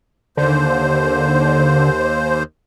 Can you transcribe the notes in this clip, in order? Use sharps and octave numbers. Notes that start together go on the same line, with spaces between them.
D#2 D3 C5